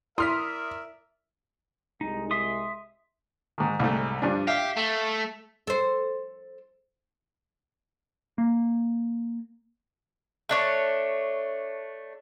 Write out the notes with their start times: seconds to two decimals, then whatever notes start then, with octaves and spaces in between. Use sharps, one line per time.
0.18 E4 A#4 D5 E5 C6 D#6 F6 B6
2.01 C2 G#3 D#4
2.31 E5 C6 D#6
3.58 G#2 D#3
3.79 C2 G#2 A3
4.22 G2 F3 D4
4.47 G4 E5 F5
4.76 A3
5.67 A4 C5
8.38 A#3
10.49 A3 D4 C#5